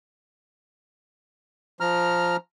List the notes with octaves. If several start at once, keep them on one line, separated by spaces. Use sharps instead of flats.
F3 A#5 F6